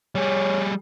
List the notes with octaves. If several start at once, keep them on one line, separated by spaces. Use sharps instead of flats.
G3 G#4 C#5